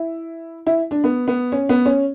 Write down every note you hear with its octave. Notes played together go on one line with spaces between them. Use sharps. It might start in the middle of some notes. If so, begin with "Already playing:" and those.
Already playing: E4
E4
D4
B3
B3
C#4
B3
C#4